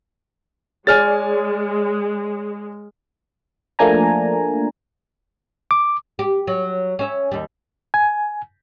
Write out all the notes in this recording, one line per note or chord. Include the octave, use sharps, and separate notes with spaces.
G#3 G#4 C#5 D5 G#5 F6 A6
F3 A3 A#3 D4 G#5 A#5
D6
G4
F#3
C#4 E5
D#2 G3
G#5